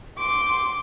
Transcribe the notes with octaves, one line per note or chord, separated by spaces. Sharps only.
C6 D6